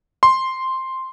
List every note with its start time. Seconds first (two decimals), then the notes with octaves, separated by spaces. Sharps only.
0.23 C6